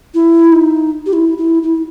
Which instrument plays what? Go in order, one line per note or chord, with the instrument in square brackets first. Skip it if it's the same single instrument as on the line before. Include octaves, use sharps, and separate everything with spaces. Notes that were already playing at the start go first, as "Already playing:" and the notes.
[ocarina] E4
D#4
G4
E4
E4
E4